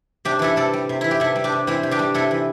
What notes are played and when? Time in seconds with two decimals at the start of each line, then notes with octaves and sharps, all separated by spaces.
0.25 C3 D4 G4
0.39 E3 E4 A4
0.56 C3 A4 D5
0.73 G3
0.89 C3
1.01 E3 E4
1.11 G4
1.20 C3 E4 A4
1.35 G3
1.44 D4 G4
1.52 C3
1.67 E3 C4 E4
1.83 C3
1.91 D4 G4
1.99 G3
2.14 C3 E4 A4
2.31 E3